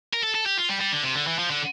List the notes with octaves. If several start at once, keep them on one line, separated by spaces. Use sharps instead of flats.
A#4
A4
A4
G4
F4
G3
G3
D3
C3
D3
E3
F3
D3